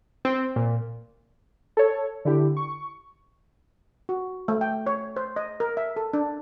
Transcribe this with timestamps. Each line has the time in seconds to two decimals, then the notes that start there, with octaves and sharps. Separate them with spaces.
0.25 C4
0.56 A#2
1.77 A4 C#5
2.25 D3 E4 G4
2.57 C#6
4.09 F#4
4.48 A3
4.61 G5
4.87 C#5
5.16 C5
5.36 D#5
5.60 A#4
5.77 E5
5.96 A4
6.13 D4